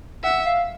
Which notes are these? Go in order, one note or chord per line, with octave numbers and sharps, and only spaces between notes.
E5 F#5
F5